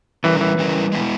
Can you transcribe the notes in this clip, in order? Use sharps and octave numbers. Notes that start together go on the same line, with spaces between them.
E3 G3 C#4 E4 A#4
E3
G3 C#4 E4 A#4
G#3 B3 E4